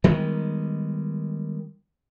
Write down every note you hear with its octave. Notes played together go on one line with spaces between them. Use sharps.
D#3 G3 G#3 B3